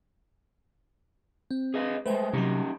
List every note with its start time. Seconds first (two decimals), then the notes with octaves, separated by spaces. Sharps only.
1.51 C4
1.74 G#4 B4 D#5
2.06 G#3 A3 B4 C5 G5
2.33 C3 F#3 C#4 D#4 G4